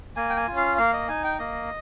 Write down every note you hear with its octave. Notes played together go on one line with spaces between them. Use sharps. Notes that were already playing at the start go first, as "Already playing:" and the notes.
A#3 G#5
G5
G#5
C#4 F4
F5
A#3 F5
D#5
D#4 G#5
G5
A#3 D#5